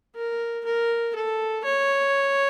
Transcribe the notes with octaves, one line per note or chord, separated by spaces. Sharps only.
A#4
A#4
A4
C#5